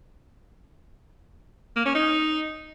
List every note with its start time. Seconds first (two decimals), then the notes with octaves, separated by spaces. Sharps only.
1.76 A#3
1.86 C#4
1.95 D#4